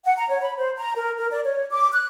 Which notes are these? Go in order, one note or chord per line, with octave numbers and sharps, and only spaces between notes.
F#5
A#5
C#5
B5
C5
A#5
A#4
A#4
D5
C#5
D6
F#6